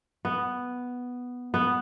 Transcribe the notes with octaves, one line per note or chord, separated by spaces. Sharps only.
B3
B3